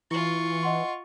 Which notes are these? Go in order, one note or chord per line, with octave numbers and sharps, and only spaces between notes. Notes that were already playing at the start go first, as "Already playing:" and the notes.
E3 E4 F4 C#6
D#5 F#5 C6